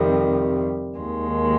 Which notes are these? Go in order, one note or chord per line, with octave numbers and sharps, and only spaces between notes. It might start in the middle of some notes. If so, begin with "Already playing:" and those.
Already playing: F2 C3 D#3 G3
D#2 D#3 G#3